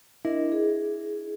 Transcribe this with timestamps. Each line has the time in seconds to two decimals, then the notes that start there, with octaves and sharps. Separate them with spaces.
0.25 D4 E4 A#4 D#5
0.52 G#4